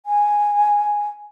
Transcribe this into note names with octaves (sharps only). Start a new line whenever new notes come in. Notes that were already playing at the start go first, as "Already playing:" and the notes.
G#5